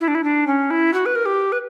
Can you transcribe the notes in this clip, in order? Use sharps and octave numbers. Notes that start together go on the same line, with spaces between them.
E4
D4
E4
D4
C#4
E4
F#4
B4
A#4
G4
B4